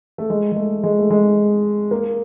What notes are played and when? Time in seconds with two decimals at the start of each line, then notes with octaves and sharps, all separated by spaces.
0.18 A3
0.30 G#3
0.52 G#3
0.56 A3
0.84 G#3
0.99 A3
1.10 G#3
1.91 A#3